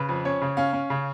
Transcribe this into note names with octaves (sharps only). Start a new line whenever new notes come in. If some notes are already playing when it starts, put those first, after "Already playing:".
Already playing: C#3 B4
F2
C#4 C#5
C#3
C#4 F5
C#4
C#3